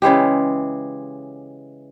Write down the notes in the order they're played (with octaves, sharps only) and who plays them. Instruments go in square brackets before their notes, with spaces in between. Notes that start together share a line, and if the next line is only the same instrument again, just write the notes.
[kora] C#3 E3 G#3 G4